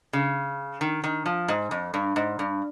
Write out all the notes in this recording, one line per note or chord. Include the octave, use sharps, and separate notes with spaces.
C#3
D#3
D#3
F3
G#2
F2
G2
G#2
G2